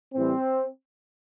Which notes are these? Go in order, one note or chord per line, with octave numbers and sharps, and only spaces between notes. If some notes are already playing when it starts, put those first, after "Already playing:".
A2 E3 G3 C4